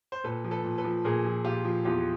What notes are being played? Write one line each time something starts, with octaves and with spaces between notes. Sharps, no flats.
C5
A#2 A4 B4
F3
A4 B4
A#2
A4 B4
F3
A#2 G#4 A#4
F3
A#2 F4 G4
F3
E2 F4 G4